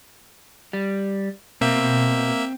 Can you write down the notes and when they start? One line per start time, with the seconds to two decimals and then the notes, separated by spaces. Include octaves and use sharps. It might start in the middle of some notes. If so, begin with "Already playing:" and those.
0.73 G3
1.61 B2 A#3 C4 E5